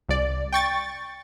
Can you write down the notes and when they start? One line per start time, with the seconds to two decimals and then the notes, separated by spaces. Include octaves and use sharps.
0.09 C2 D5
0.52 G5 C#6 A6